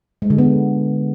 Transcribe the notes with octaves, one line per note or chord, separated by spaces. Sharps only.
G#3
D3
B3